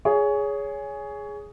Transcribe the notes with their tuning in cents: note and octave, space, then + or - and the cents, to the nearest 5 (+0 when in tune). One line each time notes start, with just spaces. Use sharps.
G#4 +0 C#5 +20